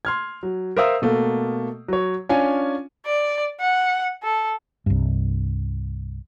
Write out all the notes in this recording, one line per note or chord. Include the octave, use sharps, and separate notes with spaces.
C6 F6 G#6
F#3
A#4 C5 E5 F5 D#6 E6
B2 A3 A#3
F#3 C#5
C#4 D4 F4 C#5 G#5
D5
F#5
A4
C2 G2